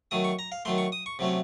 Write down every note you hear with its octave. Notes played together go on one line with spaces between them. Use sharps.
D#3 F#3 A3 D#6
C#6
A#5
F5
D#3 F#3 A3 C6
C#6
D#6
C#6
C3 F#3 A3 C#4